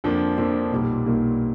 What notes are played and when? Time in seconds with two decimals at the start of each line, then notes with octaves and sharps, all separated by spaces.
0.04 F2 D3 F3 A#3 D4
0.37 F2 D3 F3 A#3 D4
0.71 B1 A#2 G3 A#3
1.05 B1 A#2 G3 A#3